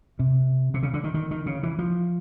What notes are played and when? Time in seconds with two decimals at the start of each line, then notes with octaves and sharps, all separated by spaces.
0.19 C3
0.74 C3
0.83 C#3
0.94 D3
1.04 D#3
1.14 D#3
1.31 D#3
1.46 C#3
1.63 E3
1.79 F3